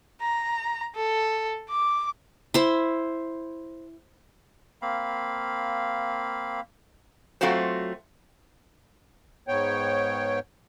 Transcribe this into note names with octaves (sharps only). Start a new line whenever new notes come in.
A#5
A4
D6
E4 C5
A#3 C4 F5 B5
F#3 A3 C4 F4 F#4 C5
G#2 B3 C#5 G5